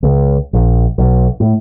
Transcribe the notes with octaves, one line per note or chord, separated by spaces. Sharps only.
C#2
A#1
B1
A2